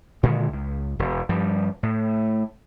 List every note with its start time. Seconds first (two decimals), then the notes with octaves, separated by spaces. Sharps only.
0.23 A#2 D3 D#3 G#3
0.53 C#2
0.99 E1
1.29 G2 F3 G3
1.83 A2